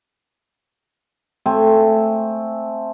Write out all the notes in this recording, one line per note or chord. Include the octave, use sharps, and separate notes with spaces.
A3 C4 G#5